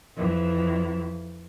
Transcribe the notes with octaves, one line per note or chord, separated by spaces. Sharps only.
F2 E3 E5